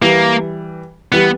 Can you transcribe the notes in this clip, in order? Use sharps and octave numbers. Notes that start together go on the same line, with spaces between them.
E3 G3 A#3
E3 G3 B3